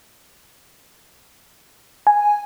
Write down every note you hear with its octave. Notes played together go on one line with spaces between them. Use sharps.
G#5